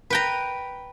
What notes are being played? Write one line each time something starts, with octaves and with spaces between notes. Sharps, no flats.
B4 G5 A#5